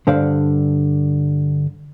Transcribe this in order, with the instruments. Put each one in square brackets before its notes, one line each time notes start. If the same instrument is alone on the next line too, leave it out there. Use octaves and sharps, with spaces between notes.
[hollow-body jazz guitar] G2 D3 C5 D5 F5